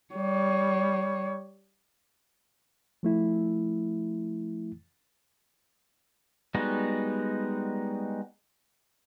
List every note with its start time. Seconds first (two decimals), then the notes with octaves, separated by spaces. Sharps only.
0.14 G3 C#5
3.03 F3 A3 E4
6.55 G3 G#3 B3 D#4 F#4